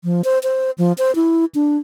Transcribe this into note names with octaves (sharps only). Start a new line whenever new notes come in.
F3
C5
C5
F3
C5
E4
D4